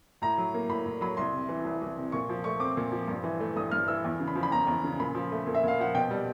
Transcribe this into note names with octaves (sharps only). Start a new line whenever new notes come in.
A2 A#5
F#3
A#3
A2 B5
A2
F#3 B5
C2 C6
C3
E3
C2
C2
C3
A#2 C#6
F3
A3 C#6
C4 D6
A#2
F3
G2
E3
A3
G2 D#6
G2 F6
E3 E6
E2
C#3
B5
F3
B5
E2 A#5
E2
C#3
A#2 B5
F3
A3
A#2
E5
A#2 F5
F3 F#5
B2 G5
G3